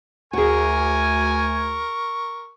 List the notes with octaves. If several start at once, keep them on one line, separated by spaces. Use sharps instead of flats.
D2 F#4 G#4 A#4 G#5 C#6